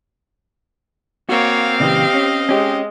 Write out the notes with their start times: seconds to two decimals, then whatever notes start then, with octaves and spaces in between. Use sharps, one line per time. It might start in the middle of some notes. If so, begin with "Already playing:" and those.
1.29 A#3 C4 F#4 C#5 F5
1.80 A#2 C#3 E3 G4 D#5
2.13 C#4
2.49 G#3 C#4 G4